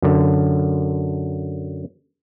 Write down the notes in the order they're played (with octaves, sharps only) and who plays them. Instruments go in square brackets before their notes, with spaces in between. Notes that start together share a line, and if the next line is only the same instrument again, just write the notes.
[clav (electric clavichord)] F#2 D3